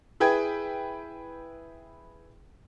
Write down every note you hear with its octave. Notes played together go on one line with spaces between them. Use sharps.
E4 G#4 B4 G5 G#6